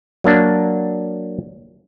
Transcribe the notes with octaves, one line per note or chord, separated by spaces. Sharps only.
F#3 A#3 D4